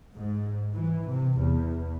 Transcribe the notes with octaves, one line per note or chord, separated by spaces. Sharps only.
G#2
E3
C3
E2